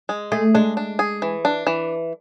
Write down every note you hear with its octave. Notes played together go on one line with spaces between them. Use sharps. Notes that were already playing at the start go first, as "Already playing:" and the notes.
G#3
A3 G#4
G#3 D4
D4
G#4
E3
D4
E3